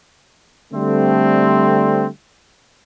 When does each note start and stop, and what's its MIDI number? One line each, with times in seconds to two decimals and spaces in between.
0.72 2.07 50
0.72 2.07 55
0.72 2.07 57
0.72 2.07 60